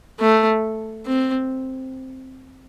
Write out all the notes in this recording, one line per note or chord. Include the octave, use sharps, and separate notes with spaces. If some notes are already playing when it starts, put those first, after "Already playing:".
A3
C4